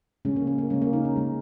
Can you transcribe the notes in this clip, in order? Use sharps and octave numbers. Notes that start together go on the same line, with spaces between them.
C#3 G#3 C#4
A#3
C#4
A#3
C#3 G#3 C#4
A#3
D#4
C#4
C#3 G#3